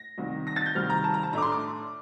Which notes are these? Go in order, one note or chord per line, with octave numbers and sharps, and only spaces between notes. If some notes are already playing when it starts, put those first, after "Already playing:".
Already playing: A#6
C2 C3 D#3
A#6
A6
G6
C2 C3 D#3 G3 C4 F6
A#5
A5
A#5
A5
A2 A3 D4 A#5 D6
C6
D6